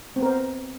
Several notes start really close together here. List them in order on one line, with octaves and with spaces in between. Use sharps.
C4 B3 A#4 C5